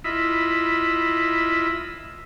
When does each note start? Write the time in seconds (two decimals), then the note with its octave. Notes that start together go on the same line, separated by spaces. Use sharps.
0.04 E4 F4 D#5 E5 B5